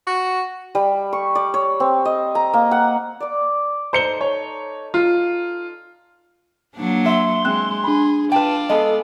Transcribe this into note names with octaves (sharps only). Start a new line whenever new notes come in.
F#4
G3
C#6
D5
C#5
C4
D#5
A#5
A#3
F#5
D5 D6
D#4 A4 B4 C5 C#7 G7
C#5
F4
F#3 A#3 D4
E5 C6
G#3 C4 F#6
D4 G#4 B5
F4 B4 D5 G5 A5
G#3 B3 A4 D#5 A5